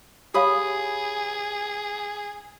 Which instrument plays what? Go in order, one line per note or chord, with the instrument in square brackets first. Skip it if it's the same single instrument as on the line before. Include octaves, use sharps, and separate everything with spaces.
[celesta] G4 C#5 F5 [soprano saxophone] G#4 [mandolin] B5 D#6